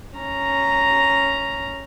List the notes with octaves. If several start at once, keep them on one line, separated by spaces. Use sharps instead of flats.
C#4 A#5